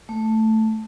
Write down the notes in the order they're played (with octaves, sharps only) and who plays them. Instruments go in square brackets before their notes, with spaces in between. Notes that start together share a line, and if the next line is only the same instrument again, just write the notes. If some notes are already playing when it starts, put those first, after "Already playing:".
[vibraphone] A3